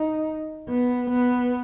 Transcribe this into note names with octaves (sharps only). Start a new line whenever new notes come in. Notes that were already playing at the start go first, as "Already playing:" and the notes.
Already playing: D#4
B3
B3